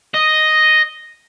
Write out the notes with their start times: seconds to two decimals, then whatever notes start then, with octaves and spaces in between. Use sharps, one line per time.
0.14 D#5